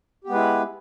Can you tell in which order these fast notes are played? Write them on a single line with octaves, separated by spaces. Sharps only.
G4 B3 G#3 B4 E4